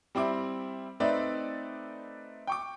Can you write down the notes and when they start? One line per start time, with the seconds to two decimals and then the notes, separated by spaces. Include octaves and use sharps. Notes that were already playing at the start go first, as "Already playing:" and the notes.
0.15 G3 C4 E4 D6
1.00 A3 C4 D#4 B4 D5 E5
2.47 G5 C#6 D6